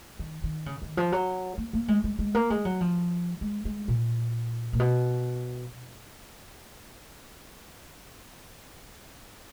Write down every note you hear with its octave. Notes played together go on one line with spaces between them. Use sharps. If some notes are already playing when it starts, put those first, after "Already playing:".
D#3
D#3
C#3
D#3
F3
F#3
A#3
A#3
G#3
G#3
G#3
A#3
G#3
F#3
F3
G#3
G#3
A#2
A#2
B2